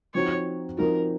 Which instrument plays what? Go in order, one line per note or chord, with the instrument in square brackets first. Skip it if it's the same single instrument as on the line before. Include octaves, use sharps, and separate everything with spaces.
[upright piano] F3 C4 D#4 F#4 [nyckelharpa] C#5
[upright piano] F3 C4 D#4 F#4 [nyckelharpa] A#4